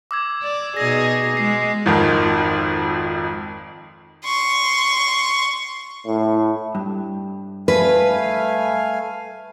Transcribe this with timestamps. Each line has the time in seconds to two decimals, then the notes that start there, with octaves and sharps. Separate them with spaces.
0.11 D6 E6 G#6
0.42 D5
0.77 B2 D#4 G#4 A#6
1.37 G#3 C7
1.86 G#1 F2 D#3
4.25 C6 C#6
6.06 A2
6.75 G2
7.68 A3 B4 F5 G#5